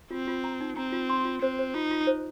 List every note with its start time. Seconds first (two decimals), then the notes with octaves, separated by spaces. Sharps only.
0.11 C4 F4
0.28 F4
0.44 A#5
0.61 D#4
0.77 C4 A#5
0.92 F4
1.09 C6
1.25 F4
1.42 C4 C5
1.59 C5
1.74 D#4 F4
1.91 F4
2.07 C5